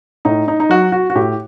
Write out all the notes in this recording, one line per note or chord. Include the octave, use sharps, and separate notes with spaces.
A2 D#4
D#4
D#4
F#3 F#4
F#4
F#4
A2 G4